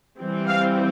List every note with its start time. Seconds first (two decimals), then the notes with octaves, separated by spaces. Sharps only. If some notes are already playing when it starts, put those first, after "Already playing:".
0.18 E3 G3 C4
0.48 F5